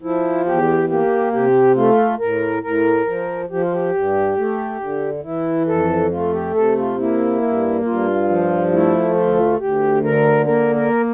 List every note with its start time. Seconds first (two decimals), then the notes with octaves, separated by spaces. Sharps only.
0.02 F3 E4
0.46 E2 G4
0.89 A#3 G4
1.32 C3 G4
1.76 A3 F4
2.20 A2 A#4
2.63 A2 A#4
3.06 F3
3.50 F3 G4
3.62 F4
3.73 G4
3.94 G2
4.37 A3
4.81 D3
5.24 E3 E4
5.67 F2 A4
6.12 A3 F4
6.33 G4
6.54 C3 A4
6.77 F4
6.98 A#3 E4
7.42 G2
7.85 G2 F4
8.29 F3
8.72 A3 E4
9.15 D2 F4
9.59 D2 G4
10.03 D3 A#4
10.46 A#3 A#4
10.75 A#4